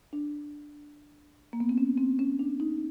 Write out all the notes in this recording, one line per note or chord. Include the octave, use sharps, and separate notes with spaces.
D4
A#3
B3
C4
C#4
C4
C#4
D4
D#4